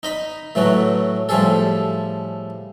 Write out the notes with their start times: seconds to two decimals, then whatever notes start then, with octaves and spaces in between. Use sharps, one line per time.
0.03 D#4 D#5 B5
0.55 A2 E3 F#3 A3 F#4
1.29 A2 F3 G3 G#4 A4